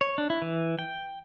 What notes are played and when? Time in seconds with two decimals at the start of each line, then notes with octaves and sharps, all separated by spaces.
0.01 C#5
0.18 D4
0.30 E4
0.42 E3
0.79 G5